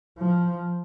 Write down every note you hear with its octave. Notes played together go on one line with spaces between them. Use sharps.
F3